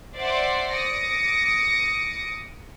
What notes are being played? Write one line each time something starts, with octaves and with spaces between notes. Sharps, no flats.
C5 D5 E5 F#5 C6 D6
D6 D#6 A#6 C#7